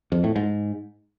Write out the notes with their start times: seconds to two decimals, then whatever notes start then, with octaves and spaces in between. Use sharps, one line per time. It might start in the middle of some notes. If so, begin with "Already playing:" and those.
0.12 F2
0.24 A2
0.36 G#2